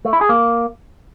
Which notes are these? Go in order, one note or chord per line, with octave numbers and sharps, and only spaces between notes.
A3
E4
G#4
A#3